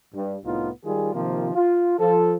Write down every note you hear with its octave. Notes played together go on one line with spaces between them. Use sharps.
G2
C2 A2 B3 D#4 F4
D#3 G3 F4 G#4
C3 D#3 F3 A#3 F4
F4
F3 A4